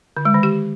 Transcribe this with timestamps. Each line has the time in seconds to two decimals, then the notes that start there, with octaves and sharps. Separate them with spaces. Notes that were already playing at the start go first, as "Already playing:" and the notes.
0.17 D3
0.25 G#3
0.34 D#3
0.43 G4